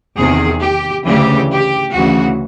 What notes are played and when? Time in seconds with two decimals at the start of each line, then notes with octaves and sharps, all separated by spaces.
0.17 E2 C3 D#3 G#4
0.62 G4
1.05 D2 C#3 E3 G4
1.50 G4
1.94 D2 C#3 E3 F#4